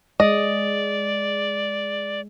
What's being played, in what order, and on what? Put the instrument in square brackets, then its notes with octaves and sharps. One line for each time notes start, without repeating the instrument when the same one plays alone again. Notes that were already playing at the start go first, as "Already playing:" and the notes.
[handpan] G#3 [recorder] D5 [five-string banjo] D#5